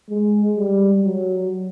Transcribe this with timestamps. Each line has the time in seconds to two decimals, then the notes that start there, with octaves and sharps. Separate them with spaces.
0.10 G#3
0.57 G3
1.04 F#3